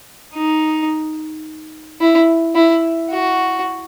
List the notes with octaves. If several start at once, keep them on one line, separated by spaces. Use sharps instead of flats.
D#4
E4
E4
F#4